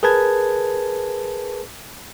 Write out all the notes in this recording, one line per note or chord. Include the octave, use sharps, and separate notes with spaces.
G#4 A#4 B4 A5 G#6